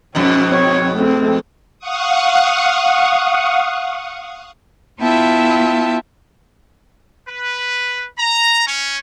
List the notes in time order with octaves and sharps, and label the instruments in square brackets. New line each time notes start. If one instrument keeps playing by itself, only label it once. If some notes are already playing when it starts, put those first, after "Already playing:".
[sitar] F2 G#2 B2 [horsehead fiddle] C#4
[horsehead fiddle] C4 C#5
A3 C4
[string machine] F5 F#5 C#6 D#6
[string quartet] B3 E4 F4 E5 G5 A5
[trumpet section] B4
A#5
C#4